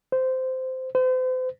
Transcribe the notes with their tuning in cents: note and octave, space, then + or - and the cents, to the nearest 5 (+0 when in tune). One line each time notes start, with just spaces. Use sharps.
C5 -15
C5 -40